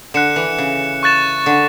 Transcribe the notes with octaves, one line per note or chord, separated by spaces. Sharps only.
D3 F#6 C#7 E7
E3
C#3
C#6 F#6 A6 E7
D3